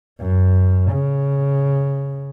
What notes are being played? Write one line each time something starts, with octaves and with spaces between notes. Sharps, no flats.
F#2
C#3